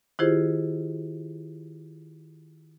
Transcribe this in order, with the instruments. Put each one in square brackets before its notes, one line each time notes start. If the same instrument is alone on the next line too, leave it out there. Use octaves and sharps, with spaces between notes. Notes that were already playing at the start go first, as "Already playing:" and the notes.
[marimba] D#3 E4 F4 G4 G#4 C5